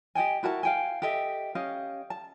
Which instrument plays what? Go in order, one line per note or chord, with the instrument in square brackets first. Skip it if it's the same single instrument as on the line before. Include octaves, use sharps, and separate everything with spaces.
[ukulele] G4 D#5 G5 G#5
E4 F#4 A#4 A5
F5 G5 G#5
G4 A4 D#5 E5
C#4 G4 D#5 F5
A5